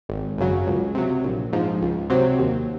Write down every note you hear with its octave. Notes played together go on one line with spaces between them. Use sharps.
G#1
F#2 C#3 F#3
C#2
C3 F#3
A#1
G#2 F3
C#2
C3 F#3 C4
D#2